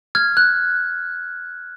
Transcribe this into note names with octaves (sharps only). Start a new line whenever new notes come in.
F6 G#6
F#6